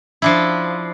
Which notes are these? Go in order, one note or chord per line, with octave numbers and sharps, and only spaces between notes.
F3 D4 E4